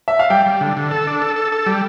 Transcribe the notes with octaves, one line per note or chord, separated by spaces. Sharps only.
E5
F5
G3 G5
G3
D3
D3
A4
D4
A4
A4
A4
G3